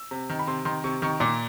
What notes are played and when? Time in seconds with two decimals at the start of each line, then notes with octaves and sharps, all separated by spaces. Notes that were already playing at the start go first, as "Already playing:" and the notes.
Already playing: E6
0.11 C3
0.30 D#3
0.39 B5
0.47 C3 C6
0.65 D#3 C6
0.84 C3 C#6
1.02 D#3 C#6
1.20 A#2 D6